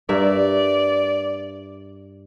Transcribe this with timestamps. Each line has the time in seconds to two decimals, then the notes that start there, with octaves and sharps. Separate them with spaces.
0.09 G2 A#4 D5 E5